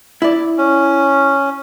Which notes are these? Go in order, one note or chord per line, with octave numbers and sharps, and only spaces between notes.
E4 D5
C#4